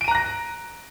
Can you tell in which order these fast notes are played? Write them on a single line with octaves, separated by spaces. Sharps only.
D7 D#7 A#5 F#6 A#6